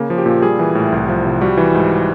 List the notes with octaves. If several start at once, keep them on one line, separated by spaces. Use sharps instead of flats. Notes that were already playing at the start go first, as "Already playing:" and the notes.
Already playing: C#3 A#3
F3
G4
A#2
G3 G#4
E3
A2
C2
F3
C3
G3 F#4
E3
G#2